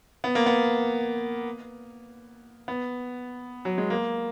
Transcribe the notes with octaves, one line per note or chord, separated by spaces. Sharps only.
B3
A#3
B3
B3
F#3
G#3
A#3